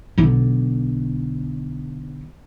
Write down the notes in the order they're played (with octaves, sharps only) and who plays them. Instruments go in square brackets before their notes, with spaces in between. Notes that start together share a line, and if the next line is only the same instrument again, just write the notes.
[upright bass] B1 D3